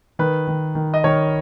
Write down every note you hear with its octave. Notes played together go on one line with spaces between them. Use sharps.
D#3 B4
D#3
D#3
D#5
D#3 A#4 C#5